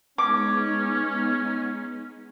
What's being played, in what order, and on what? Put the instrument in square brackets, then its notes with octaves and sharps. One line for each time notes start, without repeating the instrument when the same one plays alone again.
[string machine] G#3 B3 D#4 [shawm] C#4 [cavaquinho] D6